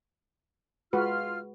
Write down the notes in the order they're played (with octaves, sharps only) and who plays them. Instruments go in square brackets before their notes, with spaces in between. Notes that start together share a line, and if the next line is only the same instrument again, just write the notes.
[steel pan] G#3 F#4 B4 [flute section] F4 F6